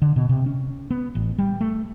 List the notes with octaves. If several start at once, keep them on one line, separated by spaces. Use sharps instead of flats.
D3
B2
C3
C#4
B3
A1
G3
A3